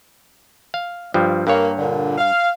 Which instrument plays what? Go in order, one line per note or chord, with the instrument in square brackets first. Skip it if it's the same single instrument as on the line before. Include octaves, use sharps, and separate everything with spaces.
[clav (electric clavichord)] F5
G2 F3 G3
[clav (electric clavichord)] G2 C#5 [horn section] A#3
[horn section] A#2 D3
F5